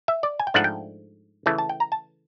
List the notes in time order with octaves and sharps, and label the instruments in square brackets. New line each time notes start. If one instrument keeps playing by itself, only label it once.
[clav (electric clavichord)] E5
D5
G#5
G5
G#2 F3 A3 D4 F#5
G5
C#3 E3 A3 A5
A5
G5
A#5
A5